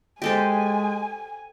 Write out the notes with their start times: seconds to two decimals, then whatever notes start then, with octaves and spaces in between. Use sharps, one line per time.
0.22 G#3 G4 A4 C5 G#5